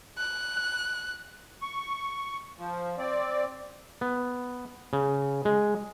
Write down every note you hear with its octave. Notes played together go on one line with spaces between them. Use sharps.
F#6
C#6
F3
C4 D5
B3
C#3
G#3